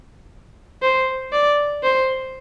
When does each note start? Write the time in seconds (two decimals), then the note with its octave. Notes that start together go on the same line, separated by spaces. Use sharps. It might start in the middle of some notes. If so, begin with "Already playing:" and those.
0.82 C5
1.32 D5
1.83 C5